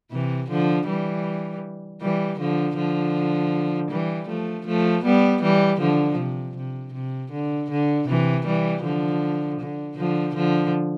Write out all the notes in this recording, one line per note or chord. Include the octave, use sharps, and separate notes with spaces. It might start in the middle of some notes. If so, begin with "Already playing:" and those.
C3 E3
D3 F3
E3 G3
E3 G3
D3 F3
D3 F3
E3 G3
F3 A3
F3 A3
G3 B3
E3 G3
D3 F3
C3
C3
C3
D3
D3
C3 E3
E3 G3
D3 F3
D3
D3 F3
D3 F3